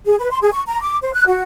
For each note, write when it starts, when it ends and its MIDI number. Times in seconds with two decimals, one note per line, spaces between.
0.06 0.15 68
0.18 0.29 71
0.30 0.37 84
0.42 0.49 68
0.53 0.62 85
0.67 0.80 82
0.80 0.97 86
1.02 1.13 72
1.13 1.24 90
1.27 1.42 66